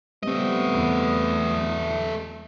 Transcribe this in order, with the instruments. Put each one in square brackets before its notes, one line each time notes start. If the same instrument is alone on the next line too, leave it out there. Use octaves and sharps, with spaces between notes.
[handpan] G3 C4 [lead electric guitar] A3 D#5 [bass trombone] B3
[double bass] E2